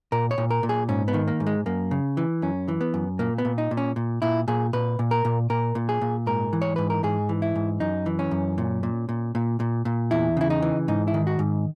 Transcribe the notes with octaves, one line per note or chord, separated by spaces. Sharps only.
A#2 A#4
C#5
A#2
A#4
A#2
G#4
G#2 C#4
B3
D#3
A#3
G#2
G#3
F#2 A#3
C#3
E3
F#2 C#4
E3
B3
F#2
A#2 A#3
B3
A#2
D#4
A#2
C#4
A#2
A#2 E4
A#2 G#4
A#2 B4
A#2
A#4
A#2
A#2 A#4
A#2
G#4
A#2
G#2 A#4
E3
C#5
G#2 B4
A#4
G#2 G#4
E3
E4
G#2
F#2 D#4
E3
C#4
F#2
A#2
A#2
A#2
A#2
A#2
A#2
E2 E4
C#3 E4
D#4
E3
G#2 D#4
E4
D#3
F#4
G#2